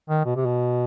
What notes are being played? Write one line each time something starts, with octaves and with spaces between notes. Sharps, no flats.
D#3
B2
C3
B2